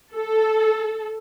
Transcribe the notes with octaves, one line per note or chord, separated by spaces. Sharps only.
A4